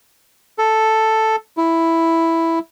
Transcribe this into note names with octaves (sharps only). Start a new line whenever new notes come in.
A4
E4